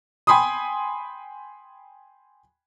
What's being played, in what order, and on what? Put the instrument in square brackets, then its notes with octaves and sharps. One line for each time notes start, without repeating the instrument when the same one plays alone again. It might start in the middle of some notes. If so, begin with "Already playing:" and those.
[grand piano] G5 G#5 B5 C6 D#6